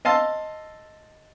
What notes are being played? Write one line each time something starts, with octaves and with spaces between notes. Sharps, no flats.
D#5 F5 A5 C6 E6